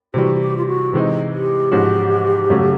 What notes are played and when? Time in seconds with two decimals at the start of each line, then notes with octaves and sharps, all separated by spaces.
0.14 C3 E3 G3 F#4
0.35 F#4
0.40 G4
0.57 F4
0.67 F#4
0.93 C3 E3 G#3 C4 D#4
1.32 G4
1.71 G#2 F3 G#3 C#4 F#4
2.50 F#2 C#3 F#3 A3 C#4